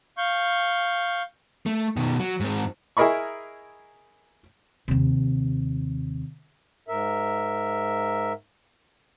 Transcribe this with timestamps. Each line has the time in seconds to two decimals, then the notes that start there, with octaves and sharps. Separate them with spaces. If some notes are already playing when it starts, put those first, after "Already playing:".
0.18 F5 C#6 G6
1.66 A3
1.96 B2 D#3
2.20 F#3
2.40 G#2 C4
2.97 E4 G#4 A#4 D#5 B5 C#6
4.88 D#2 C3
6.88 G#2 A#4 E5